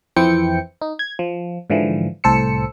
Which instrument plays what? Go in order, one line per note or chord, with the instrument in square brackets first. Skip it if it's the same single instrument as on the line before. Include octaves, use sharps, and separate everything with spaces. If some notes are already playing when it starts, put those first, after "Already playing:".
[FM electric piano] F2 E3 C4 E4 G5 C#7
D#4
G#6
F3
G#2 D3 E3 F3
C2 A2 A4 C5 E6 C#7